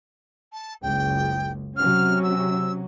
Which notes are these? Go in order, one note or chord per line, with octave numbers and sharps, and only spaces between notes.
A5
F#1 C#2 G5
C3 F#3 C#4 F6
E6